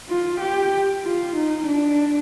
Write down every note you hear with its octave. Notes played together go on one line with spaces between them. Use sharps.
F4
G4
F4
D#4
D4